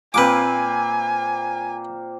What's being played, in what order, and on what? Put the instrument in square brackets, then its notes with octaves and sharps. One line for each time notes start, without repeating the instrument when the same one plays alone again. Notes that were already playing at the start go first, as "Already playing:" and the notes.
[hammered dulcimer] A#2 A#3 C4 [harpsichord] B4 D6 [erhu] G#5